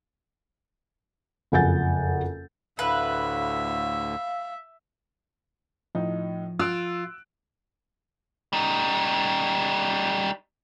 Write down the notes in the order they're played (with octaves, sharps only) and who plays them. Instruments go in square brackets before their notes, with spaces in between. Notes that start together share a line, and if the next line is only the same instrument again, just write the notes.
[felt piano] F#1 F2 F#5 G#5 G6 A6
[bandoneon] D2 A2 D3 [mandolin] B4 [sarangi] E5 [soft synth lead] F5
[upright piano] A2 D#4 [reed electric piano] F3
[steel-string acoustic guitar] F4 [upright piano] E6 F#6 D7
[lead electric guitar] G3 D#4